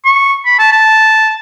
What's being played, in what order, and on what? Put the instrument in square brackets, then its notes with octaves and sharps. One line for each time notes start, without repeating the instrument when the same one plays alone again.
[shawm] C#6
B5
A5
A5